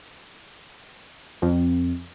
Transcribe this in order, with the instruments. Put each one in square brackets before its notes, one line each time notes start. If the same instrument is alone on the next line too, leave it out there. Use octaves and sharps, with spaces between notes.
[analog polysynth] F2